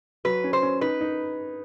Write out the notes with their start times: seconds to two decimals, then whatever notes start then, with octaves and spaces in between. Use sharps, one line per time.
0.25 F#3 B4
0.44 C#4
0.53 C5
0.63 C#4
0.81 D#4 B4
1.01 D#4